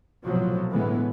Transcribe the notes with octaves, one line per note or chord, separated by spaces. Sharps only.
B1 A2 C3 F3 F#3
A2 D3 E3 G#3 B3